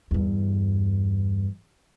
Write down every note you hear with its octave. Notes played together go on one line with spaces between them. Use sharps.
E2 G2